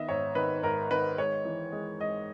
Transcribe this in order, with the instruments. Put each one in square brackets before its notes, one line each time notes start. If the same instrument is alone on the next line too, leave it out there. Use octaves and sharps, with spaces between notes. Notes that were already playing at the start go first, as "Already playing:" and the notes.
Already playing: [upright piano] D#3 B3 D#5 E5
G#2 C#5
D#3 B4
G#2 A#4
D#3 B4
G#3 C#5
E3
G#3
G#3 D#5